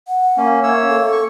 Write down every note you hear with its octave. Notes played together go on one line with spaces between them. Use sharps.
F#5
A#3 C#4
A#3 C#5 E5 E6
A4
C#6